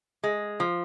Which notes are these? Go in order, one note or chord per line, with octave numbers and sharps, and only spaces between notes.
G#3
F3